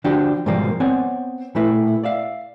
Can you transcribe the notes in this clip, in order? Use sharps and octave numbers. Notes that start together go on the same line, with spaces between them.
D3 F3 D4 F#4 G4
G#2 B2 D#3 F3 G3 A#3
B3 C4 C#5 D5 F#5 G#5
A#2 A3 E4 B4
D5 E5 F5